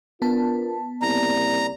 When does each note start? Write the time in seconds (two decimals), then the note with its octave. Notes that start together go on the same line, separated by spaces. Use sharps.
0.22 B3 D4 F4 A#4 A5
1.02 C2 C#3 A#3 D5 A#5